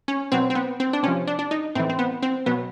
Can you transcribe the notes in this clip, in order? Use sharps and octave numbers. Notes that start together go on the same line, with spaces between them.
C#4
B2 F#3 C4
C4
B3
C4
D4
C3 F3 C#4
D4
D4
D#4
A2 E3 C4
C4
B3
C4
B2 F#3 B3